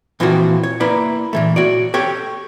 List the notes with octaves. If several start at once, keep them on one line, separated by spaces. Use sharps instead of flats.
A#2 E3 F3 A#3 C4 F#4
C#5
A#3 E4 B4 D5 E5
A#2 E3 A3
F#4 C#5 D5
G4 A4 C#5